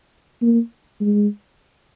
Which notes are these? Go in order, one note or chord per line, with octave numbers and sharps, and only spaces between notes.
A#3
G#3